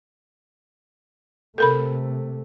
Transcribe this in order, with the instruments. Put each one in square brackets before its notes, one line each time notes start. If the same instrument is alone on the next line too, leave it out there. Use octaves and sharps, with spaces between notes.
[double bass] C3 A3 [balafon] A4 A#4 B5